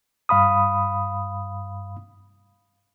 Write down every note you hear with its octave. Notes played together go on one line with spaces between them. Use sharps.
G2 F5 B5 D#6